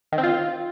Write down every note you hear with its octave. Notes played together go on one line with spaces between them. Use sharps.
D#3
C4
F4